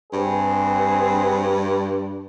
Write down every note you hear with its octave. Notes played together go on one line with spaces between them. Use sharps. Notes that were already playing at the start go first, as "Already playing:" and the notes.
G2 C4 G#4 B4